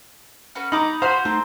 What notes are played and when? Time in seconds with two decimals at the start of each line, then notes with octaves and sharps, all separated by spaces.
0.55 C#4 F#4 B4
0.72 B3 D#4 A#5 B5 D6
1.02 F#4 C5 F5 B5 C6
1.25 A3 C4 D#4